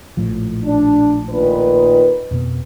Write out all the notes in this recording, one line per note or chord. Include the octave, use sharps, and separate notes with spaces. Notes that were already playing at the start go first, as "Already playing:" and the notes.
A#1 A2 F3
D4
A#2 D#3 B4
F2 B2 B3